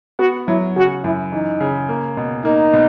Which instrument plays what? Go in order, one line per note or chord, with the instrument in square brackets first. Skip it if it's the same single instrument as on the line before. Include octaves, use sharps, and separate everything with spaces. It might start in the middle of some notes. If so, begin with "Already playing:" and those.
[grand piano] B3 [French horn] F#4
[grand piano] F#3 [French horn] E4
[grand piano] C#3 [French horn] F#4
[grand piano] F#2 [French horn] E4
[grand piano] E3 [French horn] D#4
[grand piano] C#3
A#3
B2
[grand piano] A#3 [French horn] D#4
[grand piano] B2